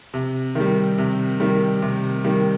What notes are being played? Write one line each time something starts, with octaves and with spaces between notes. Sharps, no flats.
C3
D#3 G3
C3
D#3 G3
C3
D#3 G3